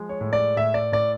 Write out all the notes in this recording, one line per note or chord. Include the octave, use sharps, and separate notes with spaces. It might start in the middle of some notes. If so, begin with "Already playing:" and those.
Already playing: F3 G#3
C#5
A2
D5
A2 E5
D5
A2 D5